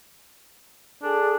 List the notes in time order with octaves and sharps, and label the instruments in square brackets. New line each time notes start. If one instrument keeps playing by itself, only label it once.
[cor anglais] D4 [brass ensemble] G#4 A4